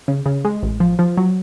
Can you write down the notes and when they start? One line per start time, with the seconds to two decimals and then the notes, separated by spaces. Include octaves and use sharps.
0.08 C#3
0.26 C#3
0.45 G#3
0.63 A1
0.80 F3
0.99 F3
1.17 F#3